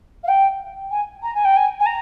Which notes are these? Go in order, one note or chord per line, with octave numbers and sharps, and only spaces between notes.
F5
G5
G#5
A#5
G#5
G5
G#5
G#5
A#5